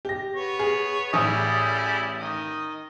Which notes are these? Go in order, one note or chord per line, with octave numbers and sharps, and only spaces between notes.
G4 A#6
B3 C#5
G#4
A1 G3 E4 G#4 D#6
D#3 D#5